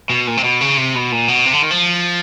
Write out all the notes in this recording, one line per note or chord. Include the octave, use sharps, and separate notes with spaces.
B2
A#2
C3
B2
C#3
C3
B2
A#2
B2
C3
D3
D#3
F3